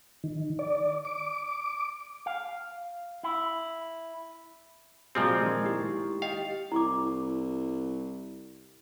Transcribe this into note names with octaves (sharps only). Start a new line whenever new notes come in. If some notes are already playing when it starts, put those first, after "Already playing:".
D#3
D5
D6
F5
E4
A#2 F3 F#3 C4 G#4 C5 D#5
D#3 G#3 G#6
E4 G4
G4 D#5 F5 G5
C2 E4 C#6 D6